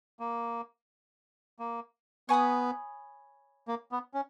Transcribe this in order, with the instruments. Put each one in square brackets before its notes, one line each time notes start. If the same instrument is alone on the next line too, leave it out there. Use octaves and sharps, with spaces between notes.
[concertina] A#3
A#3
[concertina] B3 [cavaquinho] C#5 G#5 B5 D#6
[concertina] A#3
B3
C#4